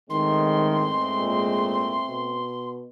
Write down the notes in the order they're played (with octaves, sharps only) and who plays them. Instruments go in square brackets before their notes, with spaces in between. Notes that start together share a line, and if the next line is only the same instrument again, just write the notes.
[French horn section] E2 G#2 G#3 [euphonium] D#3 [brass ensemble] A3 C4 [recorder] C6
[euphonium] A#2
B2